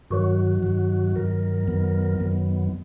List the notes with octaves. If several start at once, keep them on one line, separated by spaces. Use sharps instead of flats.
G2 D#3 F#3 F#4
G2 D#3 F#3
G2 D#3 F#3 A#4
F#2 D#3 F#3 B3
F#2 D#3 F#3 B3